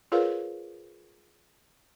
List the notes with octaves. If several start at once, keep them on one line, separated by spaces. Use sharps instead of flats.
F4 G#4 A#4 B4 C#5 F5